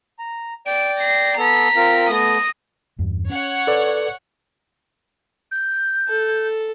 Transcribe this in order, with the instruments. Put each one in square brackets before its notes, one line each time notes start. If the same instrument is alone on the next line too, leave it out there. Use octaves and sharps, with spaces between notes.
[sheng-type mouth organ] A#5
[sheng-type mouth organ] D5 G5 [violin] D7
[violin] A#6 C7
[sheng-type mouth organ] B3 A4 [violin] A#5 B6
[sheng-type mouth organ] C4 F4 A#4
[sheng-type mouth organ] A3 B3 [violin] D#6 A#6
[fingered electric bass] E2 G2
[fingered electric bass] C#4 [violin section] C#5 F#5
[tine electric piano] A4 B4 D5
[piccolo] G6
[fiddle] A4